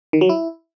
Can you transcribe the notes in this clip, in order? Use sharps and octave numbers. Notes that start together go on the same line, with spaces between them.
D#3
F#3
E4